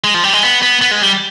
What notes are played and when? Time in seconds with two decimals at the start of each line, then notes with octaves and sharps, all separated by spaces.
0.04 G#3
0.14 F3
0.24 G3
0.33 G#3
0.43 B3
0.63 B3
0.82 B3
0.91 G#3
1.02 G3